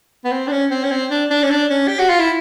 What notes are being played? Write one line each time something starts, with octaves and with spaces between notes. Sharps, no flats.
B3
C4
D4
C#4
C4
C#4
C4
D4
D4
C#4
D4
C#4
G4
F#4
F4
E4